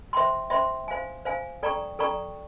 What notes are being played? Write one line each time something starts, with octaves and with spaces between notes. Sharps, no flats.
C5 E5 G5 C6
C5 E5 G5 C6
C5 F5 G#5
C5 F5 G#5
A4 D5 G5 A#5 C#6
A4 D5 G5 A#5 C#6